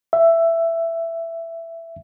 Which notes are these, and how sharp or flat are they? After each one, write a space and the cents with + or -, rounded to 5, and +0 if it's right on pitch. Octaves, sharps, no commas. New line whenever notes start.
E5 +10